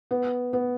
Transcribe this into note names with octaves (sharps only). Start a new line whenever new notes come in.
B3
B3